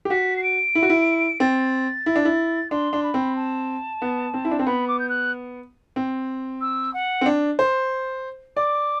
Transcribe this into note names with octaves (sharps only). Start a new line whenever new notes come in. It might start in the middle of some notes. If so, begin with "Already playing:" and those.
G4
F#4 B6
C7
D7
E4
F#4
E4
C4 A6
E4
D4
E4
D4 C6
D4
B5
C4
A5
B3
C4
E4
D4
C4 A5
B3 B5
D6
G6
F#6
C4
E6
F#5
C4
D4
C5
D5 D6